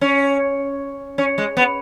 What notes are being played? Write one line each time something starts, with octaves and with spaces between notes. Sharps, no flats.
C#4
C#4
G#3
B3